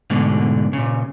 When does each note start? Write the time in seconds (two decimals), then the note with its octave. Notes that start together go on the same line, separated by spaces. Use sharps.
0.10 D2 G#2 B2 D3
0.73 A#2 C#3